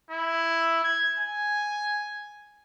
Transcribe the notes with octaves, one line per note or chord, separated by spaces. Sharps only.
E4
G#6
G#5